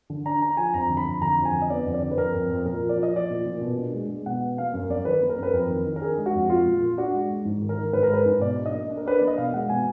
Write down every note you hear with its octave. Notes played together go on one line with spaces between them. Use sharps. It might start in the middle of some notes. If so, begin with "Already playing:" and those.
D3
D4 A#5
D4 A#5
F3 G#5
F2 A#5
D3
B5
F2
D3 A#5
F2
G#5
D3
D#5
B3 D5
F2
D5
D3
B4
F2 A#4
F2
F2
A#2 A#4
F3
D5
F3
D#5
F3 D5
A#2
A#2
B2
D4
G#3
G#3
B2 F#5
B3
A#3 F5
F#2
F#2 D5
D#3 B4
A#3
A#4
F#2 B4
F2 A#4
D#3
D#3
A#4
D4 G#4
G#3
F#4
F2
G#3 F4
A#2
A#2
D4 F#4
G#3
G#3
G#2
D#3
A#4
D#3
G#2 B4
A#4
G#3 B4
G#2
B2 D5
D4
D#5
A#3
D4
A#4
D4 B4
A#3 D5
D#5
B2 F5
G#3 F#5
B2 G#5